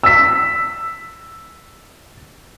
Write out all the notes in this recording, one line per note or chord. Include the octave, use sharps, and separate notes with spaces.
E6 B6